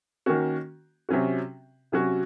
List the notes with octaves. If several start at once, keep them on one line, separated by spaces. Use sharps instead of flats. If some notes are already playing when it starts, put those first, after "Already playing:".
D#3 A#3 C#4 F#4
C3 F#3 C#4 F#4
C3 F#3 C#4 F#4